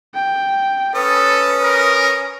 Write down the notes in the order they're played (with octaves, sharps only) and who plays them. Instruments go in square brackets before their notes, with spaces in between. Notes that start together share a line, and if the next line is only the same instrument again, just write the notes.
[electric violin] G5
[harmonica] C#4 D#6 [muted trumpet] A4 [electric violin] B4
[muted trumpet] A#4